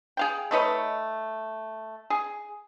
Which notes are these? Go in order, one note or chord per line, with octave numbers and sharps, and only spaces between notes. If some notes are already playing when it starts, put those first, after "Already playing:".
G#4 F5 G5
A3 D#4 B4 C#5
G#4